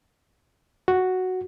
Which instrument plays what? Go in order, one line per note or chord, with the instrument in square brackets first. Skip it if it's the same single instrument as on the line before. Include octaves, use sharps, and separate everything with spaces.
[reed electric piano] F#4